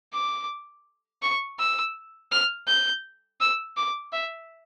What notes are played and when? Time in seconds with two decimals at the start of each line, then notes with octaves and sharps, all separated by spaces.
0.13 D6
1.22 C#6
1.58 E6
2.32 F6
2.67 G6
3.41 E6
3.77 D6
4.13 E5